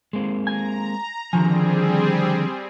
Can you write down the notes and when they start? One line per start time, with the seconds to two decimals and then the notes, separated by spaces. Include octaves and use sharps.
0.13 G#3 A#3 C4
0.47 G#5 A#5
1.33 D3 D#3 F3 G3 C4 G#4 G#5